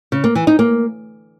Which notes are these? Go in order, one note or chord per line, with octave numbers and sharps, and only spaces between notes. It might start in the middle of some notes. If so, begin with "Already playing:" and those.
C#3
A#3
E3
D#4
A#3